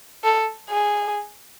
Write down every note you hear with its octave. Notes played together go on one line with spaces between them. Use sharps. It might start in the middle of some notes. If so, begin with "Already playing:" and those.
A4
G#4